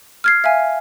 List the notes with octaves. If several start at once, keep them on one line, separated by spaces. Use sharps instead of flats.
F6 G#6 C7
E5 F5 G#5